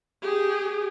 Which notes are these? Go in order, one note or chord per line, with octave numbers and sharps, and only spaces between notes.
G4 G#4